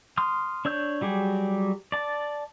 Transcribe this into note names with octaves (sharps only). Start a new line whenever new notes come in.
C6 D#6 F6
D4 C#5 E6 G6
F#3 G3 G4 G#4
D5 A5